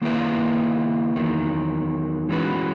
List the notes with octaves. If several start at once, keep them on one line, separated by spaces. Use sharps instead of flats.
D#3 A#3 E4 B4 E5
E2 D#3 F#3
E3 G#3 C#4 F#4 B4